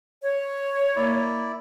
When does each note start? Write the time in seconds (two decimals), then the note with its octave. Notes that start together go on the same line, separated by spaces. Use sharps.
0.22 C#5
0.96 A#3 E4 D5